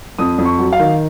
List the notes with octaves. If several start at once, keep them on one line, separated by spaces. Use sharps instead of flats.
F2 D#6
F2
C#6
F#3
F5
D#3